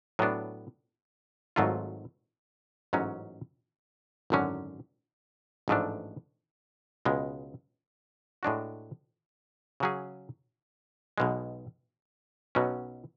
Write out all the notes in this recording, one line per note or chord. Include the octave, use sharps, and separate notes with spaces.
A2 F#3 B3 D4
G#1 G#2 F#3 A3 F4
A1 G#2 F#3 C#4
G#1 F#2 D3 F#3 C#4
A1 G#2 F3 A3 D4
C#2 B2 G#3
A2 G#3 D4 F#4
C#3 F#3 C#4 G#4
B1 B2 G#3
B1 B2 F#3 C#4